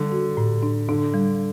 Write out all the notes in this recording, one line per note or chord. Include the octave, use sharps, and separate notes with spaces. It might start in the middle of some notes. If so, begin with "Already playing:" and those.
Already playing: D3 G3
F#4
A2
D4
D3 D4
G3